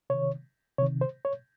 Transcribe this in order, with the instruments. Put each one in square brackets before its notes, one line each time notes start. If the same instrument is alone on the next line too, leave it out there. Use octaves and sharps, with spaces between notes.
[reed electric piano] C3 D#3 C#5
C3 D#3 C#5
C5
C#5